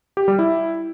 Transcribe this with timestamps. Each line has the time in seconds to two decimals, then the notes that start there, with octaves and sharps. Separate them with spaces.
0.17 G4
0.28 G3
0.39 E4